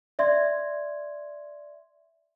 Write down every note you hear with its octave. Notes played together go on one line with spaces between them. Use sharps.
D5 E5 C6 G#6